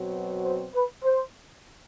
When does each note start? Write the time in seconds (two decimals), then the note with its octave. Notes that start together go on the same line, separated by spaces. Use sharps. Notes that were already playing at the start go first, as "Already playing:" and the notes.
Already playing: B2 F#3 C4
0.44 C5
0.74 B4
1.04 C5